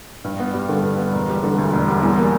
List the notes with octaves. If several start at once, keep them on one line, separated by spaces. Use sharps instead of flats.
G2
B3
G3
D3
G2
B3
E1
G3
D3
D2
E1
G3
E2
A#3